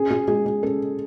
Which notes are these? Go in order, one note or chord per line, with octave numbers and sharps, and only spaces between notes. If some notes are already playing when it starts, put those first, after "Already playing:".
Already playing: C#4 G#4
G#4
G#3 G#4
G#4
C#4 A4